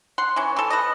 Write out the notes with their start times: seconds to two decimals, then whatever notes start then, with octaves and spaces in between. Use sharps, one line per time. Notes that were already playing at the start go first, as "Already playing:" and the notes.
0.18 F#5 C6
0.36 E3 C#4
0.56 E3 A4
0.70 B4 D#5